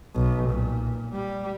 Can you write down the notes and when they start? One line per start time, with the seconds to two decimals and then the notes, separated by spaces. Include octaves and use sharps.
0.15 B1
0.50 A#2
1.13 G3